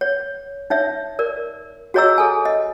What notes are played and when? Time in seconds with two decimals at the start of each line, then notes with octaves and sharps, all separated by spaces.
0.01 C#5
0.70 D#4 C#5 E5
1.19 A#4 D5
1.94 F#4 G#4 C#5 D#5 A#5 E6
2.18 G#4 A4 G#5
2.45 D#5